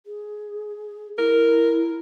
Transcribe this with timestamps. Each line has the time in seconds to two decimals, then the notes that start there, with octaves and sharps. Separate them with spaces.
0.06 G#4
1.19 E4 A#4